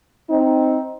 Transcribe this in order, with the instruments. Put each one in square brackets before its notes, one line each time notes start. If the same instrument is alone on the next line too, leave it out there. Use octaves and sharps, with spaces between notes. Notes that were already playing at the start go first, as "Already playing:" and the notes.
[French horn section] C4 D#4